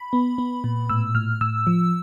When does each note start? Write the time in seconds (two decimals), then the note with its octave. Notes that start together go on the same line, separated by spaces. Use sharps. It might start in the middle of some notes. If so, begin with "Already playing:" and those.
Already playing: B5
0.13 B3
0.38 B3
0.64 A#2
0.90 A2 E6
1.15 A2 F6
1.41 A2 E6
1.67 F3